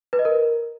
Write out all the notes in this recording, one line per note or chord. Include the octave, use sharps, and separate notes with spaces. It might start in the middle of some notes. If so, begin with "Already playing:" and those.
B4
D#5
A#4